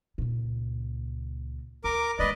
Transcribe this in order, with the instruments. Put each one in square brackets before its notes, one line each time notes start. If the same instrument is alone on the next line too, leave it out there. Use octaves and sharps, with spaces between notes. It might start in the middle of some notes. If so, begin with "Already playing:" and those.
[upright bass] C#2 A#2
[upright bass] D2 [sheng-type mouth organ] A#4 D6
[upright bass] G#3 C#4 [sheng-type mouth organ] B4 D5 D#5